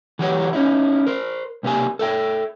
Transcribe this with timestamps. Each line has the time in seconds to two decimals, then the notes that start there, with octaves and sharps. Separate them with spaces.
0.19 E3 F#3 F#4 G4 A4 C#5
0.53 C#4 D#4 E4
1.07 A#4 C5
1.63 B1 C3 A#3 G4 G#5
1.99 A4 E5 G5